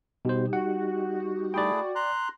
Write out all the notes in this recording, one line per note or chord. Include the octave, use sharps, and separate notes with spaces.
B2 G3 D#4 G4 C5
F#4 F#5
A3 E4 G#4 D5 G5
A#5 C6 F#6